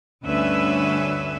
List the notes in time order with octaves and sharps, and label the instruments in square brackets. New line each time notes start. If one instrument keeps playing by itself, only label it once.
[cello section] D2 G2 C#4 D4 B4 E5